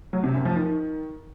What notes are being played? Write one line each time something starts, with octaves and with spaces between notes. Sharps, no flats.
F#3
C3
F#2
F3
D#3